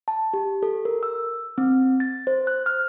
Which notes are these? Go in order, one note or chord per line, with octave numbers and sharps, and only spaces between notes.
A5
G4
A4
A#4
E6
C4
A6
C5
F#6
F6